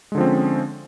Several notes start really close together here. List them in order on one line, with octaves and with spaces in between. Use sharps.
G#3 D3 F3 C4 C#4